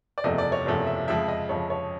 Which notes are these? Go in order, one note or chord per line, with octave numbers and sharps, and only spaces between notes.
D5
F#1 E2 C3 F3 A3 D#5
D5
C#5
F#1 E2 C3 F3 A3
E5
F2 C#3 F3 G#3 E5
D#5
F2 C#3 F3 G#3 C#5
C#5